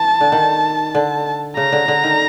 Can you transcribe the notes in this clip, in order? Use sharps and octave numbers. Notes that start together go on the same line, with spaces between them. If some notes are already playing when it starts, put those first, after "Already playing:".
Already playing: E3 A5
D3
D#3
D3
C#3 A#5
D3
D3
D#3